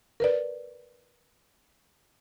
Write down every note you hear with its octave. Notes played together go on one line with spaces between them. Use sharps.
A#4 B4 D5